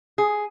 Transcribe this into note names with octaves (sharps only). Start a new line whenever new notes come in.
G#4